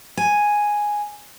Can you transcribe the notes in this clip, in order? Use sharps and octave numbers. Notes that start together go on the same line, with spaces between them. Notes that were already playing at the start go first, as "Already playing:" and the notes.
G#5